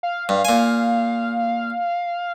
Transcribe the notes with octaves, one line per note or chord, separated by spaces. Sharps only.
F5
G2
A#2 G#5